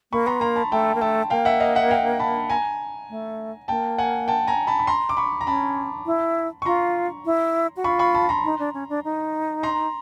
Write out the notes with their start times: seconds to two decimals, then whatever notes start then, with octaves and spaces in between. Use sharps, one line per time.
0.12 A#3 B5 C#6
0.26 B3 A#5 C6
0.40 A#3 A#5 C6
0.56 A5 B5
0.71 A3 G5 A5
0.95 A#3
1.01 A3 G5 A5
1.30 A#3 F5 G5
1.45 E5 F#5
1.60 D#5 F5
1.75 E5 F#5
1.91 F5 G5
2.19 A5 B5
2.50 G#5 A#5
3.10 A3
3.68 A#3 G5 A5
3.98 F#5 G#5
4.28 G5 A5
4.47 G#5 A#5
4.67 A5 B5
4.79 B5
4.87 A#5 C6
5.09 D6
5.17 B5 C#6
5.41 A#5
5.47 C#4 A5 B5
6.06 E4
6.62 C#6
6.65 F4 A#5 C6
7.25 E4
7.77 F#4
7.84 F4 B5 C#6
7.99 B5 C#6
8.15 A5 B5
8.29 A#5 C6
8.44 D#4
8.59 D4
8.74 C#4
8.89 D4
9.04 D#4
9.63 A#5 C6